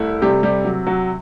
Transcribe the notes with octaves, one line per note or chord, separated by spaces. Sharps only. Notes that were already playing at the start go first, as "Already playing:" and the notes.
Already playing: C2 A3 E4
C3 G3 G4
G3 G4
F#3
F#3 F#4